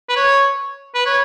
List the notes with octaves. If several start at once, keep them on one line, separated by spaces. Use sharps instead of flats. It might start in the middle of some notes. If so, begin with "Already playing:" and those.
B4
C#5
B4
C#5